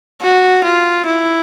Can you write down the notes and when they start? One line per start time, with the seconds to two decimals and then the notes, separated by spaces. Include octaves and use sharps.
0.21 F#4
0.63 F4
1.06 E4